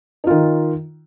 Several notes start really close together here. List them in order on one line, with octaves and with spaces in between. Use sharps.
D#4 F4 D#3